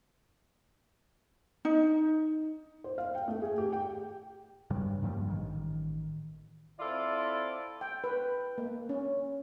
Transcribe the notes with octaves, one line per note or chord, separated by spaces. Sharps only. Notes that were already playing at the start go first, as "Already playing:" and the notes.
D#4
C5
F5
G5
A3
G#4
G4
G5
G2 C#3 G3
G2 A#2 F3 G3
A1 D#3
C4 E4 F4 A4 D5 E5
G5
B4
A#3
C#4